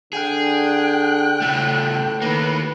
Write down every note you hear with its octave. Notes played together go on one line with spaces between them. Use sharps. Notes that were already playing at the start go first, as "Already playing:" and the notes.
D3 G#4 G5 F#6
A2 C#3 A3
D#3 A#3 B4 F#6